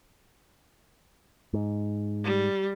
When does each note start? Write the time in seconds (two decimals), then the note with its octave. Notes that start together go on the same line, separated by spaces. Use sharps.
1.53 G#2
2.24 G3